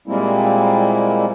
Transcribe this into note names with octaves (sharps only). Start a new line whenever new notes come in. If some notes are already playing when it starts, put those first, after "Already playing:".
A#2 G3 G#3 A#3 C4 E4